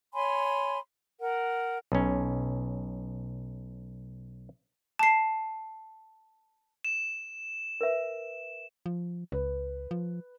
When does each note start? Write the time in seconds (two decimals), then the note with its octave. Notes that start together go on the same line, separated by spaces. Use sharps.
0.13 C#5 G#5 B5 C6
1.20 A#4 F#5
1.92 B1 C#4
4.99 A5 C7
6.84 E7
7.81 A#4 B4 E5
8.86 F3
9.32 C#2 B4
9.91 F3